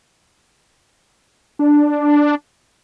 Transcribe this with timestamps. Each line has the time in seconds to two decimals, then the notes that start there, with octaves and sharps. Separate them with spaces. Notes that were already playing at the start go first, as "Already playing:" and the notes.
1.59 D4